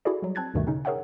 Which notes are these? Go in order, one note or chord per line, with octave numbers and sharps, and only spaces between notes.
E4 F#4 G#4 A4 D5
F#3 G3
C4 A5 F#6 G#6 A6
D2 G2 B2 D#3 G3 A3
C#3 C#4 D#4
G#4 A#4 C#5 E5 F#5 G5